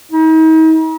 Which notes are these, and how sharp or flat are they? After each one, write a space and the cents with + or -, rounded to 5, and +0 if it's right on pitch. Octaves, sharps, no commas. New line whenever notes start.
D#4 +40